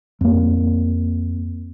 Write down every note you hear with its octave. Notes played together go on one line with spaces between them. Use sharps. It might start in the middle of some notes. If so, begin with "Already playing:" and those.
F2 A#3